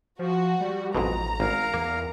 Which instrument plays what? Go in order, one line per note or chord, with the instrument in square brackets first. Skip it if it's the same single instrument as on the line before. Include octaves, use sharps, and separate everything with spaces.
[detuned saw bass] F3 [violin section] F#4
[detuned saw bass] G3
[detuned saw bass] A1 [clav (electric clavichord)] F2 G#2 B2 [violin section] A#5
[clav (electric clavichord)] G#1 [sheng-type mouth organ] A#4 F5
[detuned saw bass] E2 [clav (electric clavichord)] A#3